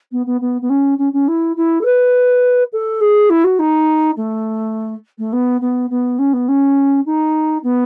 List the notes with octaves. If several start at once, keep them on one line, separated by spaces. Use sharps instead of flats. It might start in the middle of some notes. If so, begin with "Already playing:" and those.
B3
B3
B3
B3
C#4
C#4
C#4
E4
E4
A4
B4
A4
G#4
E4
F#4
D#4
A3
A3
B3
B3
B3
C#4
B3
C#4
D#4
B3